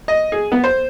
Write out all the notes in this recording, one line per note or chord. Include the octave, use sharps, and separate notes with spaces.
D#5
G#4
B3
C5